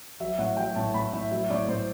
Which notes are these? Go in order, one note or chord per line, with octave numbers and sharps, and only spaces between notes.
F#3 E5
A2 F#5
F#3 G5
A2 A5
A2 B5
A2 E5
F#3 E5
A2 D5
A2 C5